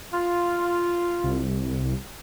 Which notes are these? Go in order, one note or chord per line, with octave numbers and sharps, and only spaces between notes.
F4
C2